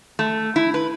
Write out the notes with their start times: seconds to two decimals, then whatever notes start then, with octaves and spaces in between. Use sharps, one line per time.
0.19 A3
0.56 E4
0.74 B4